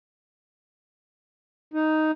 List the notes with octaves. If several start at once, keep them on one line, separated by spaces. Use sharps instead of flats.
D#4